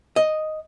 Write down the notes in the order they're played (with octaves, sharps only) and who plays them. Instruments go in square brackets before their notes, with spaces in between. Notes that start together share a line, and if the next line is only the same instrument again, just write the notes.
[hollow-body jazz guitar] D#5